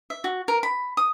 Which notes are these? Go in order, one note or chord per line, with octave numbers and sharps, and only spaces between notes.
E5
F#4
A#4
B5
D#6